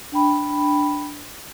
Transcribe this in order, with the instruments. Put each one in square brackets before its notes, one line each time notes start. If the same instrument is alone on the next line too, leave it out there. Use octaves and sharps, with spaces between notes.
[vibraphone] D4 G5 B5